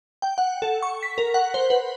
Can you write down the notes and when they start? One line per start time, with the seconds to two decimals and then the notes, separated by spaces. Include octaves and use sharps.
0.22 G5
0.38 F#5
0.62 A4
0.82 C#6
1.03 B6
1.18 A#4
1.34 F#5
1.54 C5
1.70 B4